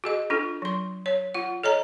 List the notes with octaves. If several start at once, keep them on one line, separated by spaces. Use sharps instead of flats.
F#4 G#4 D#5
D4 F4 A4
F#3 C6
C#5
F4 F#5
A4 C#5 D#5 A#5